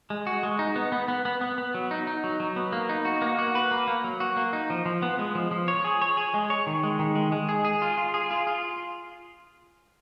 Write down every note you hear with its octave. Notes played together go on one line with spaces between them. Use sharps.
G#3
F#4
G#3
D#4
B3
B3
B3
B3
B3
B3
F#3
D#4
D#4
F#3
F#3
B3
A#3
D#4
F#4
A#3
F#4
B4
A#3
A#3
F#3
F#4
A#3
D#4
F3
F3
B3
G#3
F3
F3
C#5
G#4
C#5
G#4
G#3
C#5
D#3
G#3
D#3
G#3
G#3
G#4
G#4
F4
F4
G#4
F4
F4